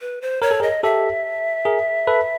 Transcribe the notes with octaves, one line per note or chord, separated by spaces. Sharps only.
B4
C5
A#4 C#5
A4
G#4 A#4
D#5
G4 A4 E5
G#4 A#4
A4 B4